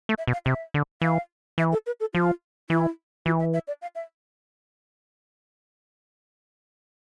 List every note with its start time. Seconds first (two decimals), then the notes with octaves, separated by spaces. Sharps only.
0.09 A3
0.18 E5
0.27 B2
0.33 F5
0.46 C3 E5
0.74 D3
1.02 E3 F5
1.58 E3 E5
1.72 A4
1.86 B4
2.00 A4
2.14 F3 F4
2.70 E3 E4
3.26 E3 F4
3.39 E5
3.53 E5
3.68 D5
3.82 F5
3.95 E5